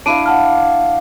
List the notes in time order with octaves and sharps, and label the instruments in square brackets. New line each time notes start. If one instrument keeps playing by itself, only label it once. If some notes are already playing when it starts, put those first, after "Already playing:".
[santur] D4 E4 F5 [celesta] D7 D#7
[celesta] F#5 A5 F6